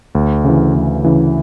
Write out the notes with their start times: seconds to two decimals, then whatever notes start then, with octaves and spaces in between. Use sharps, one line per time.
0.15 D2
0.44 C#3 E3
0.74 D2
1.04 C#3 E3